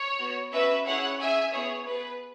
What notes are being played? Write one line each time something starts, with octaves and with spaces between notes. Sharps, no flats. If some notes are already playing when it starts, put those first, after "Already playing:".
Already playing: C#5
B3 F#4
C#4 F#4 B4 E5
C#4 E4 G#4 C#5 F#5
C#4 G#4 E5 G#5
B3 E4 G#4 C#5
B3 G#4 B4